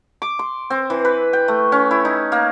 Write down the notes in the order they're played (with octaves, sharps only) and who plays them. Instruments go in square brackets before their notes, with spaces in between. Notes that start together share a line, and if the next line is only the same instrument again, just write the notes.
[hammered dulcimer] D6
C6
C4
E3
B4
G5
A3
C#4
E4
D#4
A#3